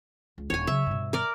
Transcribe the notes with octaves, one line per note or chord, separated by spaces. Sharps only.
C#2
D#1 D4 C#5 G#5
C#3 F#3 E5
G2 B2
A#4 D5